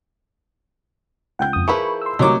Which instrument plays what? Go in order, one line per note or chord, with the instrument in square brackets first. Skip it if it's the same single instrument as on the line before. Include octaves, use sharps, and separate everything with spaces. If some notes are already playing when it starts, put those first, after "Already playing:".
[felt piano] C#2 G6 [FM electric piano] F#5 G5
[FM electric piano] F2 D#6
[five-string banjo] F3 E4 B4 [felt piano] G#4 A#4 [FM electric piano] B5 C#6
[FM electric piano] C6 E6
[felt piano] C3 A3 [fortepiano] F#3 C#5 D6 [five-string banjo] D#4